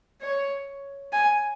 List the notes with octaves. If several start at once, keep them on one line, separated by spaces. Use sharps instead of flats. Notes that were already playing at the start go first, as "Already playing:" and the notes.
C#5
G#5